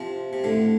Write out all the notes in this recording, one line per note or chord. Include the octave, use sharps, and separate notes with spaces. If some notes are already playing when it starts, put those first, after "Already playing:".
Already playing: C3 F3
C3
A2 D3